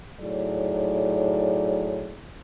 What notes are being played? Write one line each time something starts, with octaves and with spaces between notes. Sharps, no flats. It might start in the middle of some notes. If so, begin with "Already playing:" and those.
A2 F#3 D#4 G#4 D5